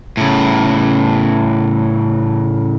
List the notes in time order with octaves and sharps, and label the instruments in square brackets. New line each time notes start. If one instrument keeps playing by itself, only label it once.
[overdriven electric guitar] A2 C#3